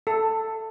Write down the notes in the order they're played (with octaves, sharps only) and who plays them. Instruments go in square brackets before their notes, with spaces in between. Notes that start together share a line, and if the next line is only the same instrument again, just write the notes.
[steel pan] A4